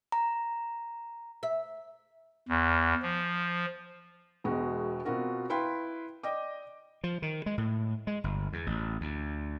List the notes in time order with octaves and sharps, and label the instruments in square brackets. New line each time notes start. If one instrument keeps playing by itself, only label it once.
[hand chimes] A#5
[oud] E5
[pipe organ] E2
F3
[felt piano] E1 B2 G#3 F#4
B2 C4 F4 F#4 A#4
E4 B4 F5 G5 C6
D5 D#5 G5 D6
[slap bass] F3
D#3
G#3
A2
G#3
G1
E2
A1
D2